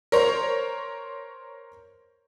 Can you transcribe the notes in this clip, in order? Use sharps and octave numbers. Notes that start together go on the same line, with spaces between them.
A#4 C5 C#5